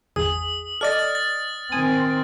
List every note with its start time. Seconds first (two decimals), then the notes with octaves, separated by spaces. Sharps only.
0.16 G#1 E2 G#4 D#6
0.81 A4 D5 D#5 F6 A6
1.15 A6
1.72 D#3 C4 G#5 D#6